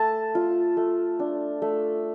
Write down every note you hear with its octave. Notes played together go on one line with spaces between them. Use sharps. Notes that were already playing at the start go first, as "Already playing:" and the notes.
Already playing: A3 A5
F4
A3
D4
A3